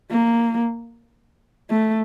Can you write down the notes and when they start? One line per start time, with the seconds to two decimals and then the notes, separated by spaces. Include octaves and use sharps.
0.11 A#3
1.70 A3